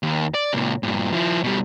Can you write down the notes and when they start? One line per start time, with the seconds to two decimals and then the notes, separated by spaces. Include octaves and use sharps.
0.03 D#2
0.34 D5
0.53 C#2 A#2
0.83 G2 A#2
1.13 F3 E4
1.43 B2 G3